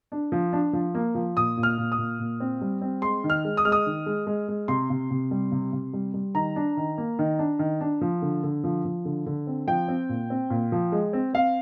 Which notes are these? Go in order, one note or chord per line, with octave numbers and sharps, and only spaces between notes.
D4
F3
D4
F3
A#3
F3
A#2 D#6
A#2
F6
A#2
D#6
A#2
A#2
C4
G3
C4
G#3 C6
D#3
F6
G#3
D#6
G#3 F6
D#6
D#3
G#3
G#3
G#3
C3 C6
C3
C3
G3
C3
C3
G3
G3
D#3 A#5
D4
D#3
A#3
D#3
D4
D#3
D4
F3
D3
D3
F3
F3
D3
D3
C4
F3 G5
C4
A#2
C4
A#2
F3
G#3
C4
C4 F5